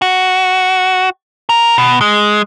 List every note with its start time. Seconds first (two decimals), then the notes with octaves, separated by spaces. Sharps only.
0.02 F#4
1.49 A#4
1.78 B2
2.01 G#3